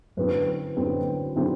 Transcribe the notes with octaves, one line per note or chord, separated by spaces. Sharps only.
F#2 D3 F#3 C4 E4 B4
F#2 D3 F#3 C4 E4
D3 F#3 C4 E4